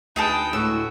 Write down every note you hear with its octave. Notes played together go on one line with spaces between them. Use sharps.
D2 D#4 G#4 B4 G5 A5
A2 G#3 F#4 E6